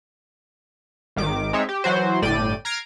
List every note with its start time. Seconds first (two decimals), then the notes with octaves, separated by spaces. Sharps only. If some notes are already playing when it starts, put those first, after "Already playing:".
1.16 G#1 D#3 D6
1.53 G#3 C4 D#4 C#5 E5
1.69 G4
1.84 E3 F#3 F#4 C5
2.22 G1 A2 D5 G5 D#7
2.65 A#5 F6 G#6 A#6 C7 D7